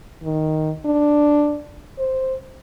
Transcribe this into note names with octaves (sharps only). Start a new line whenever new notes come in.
D#3
D4
C5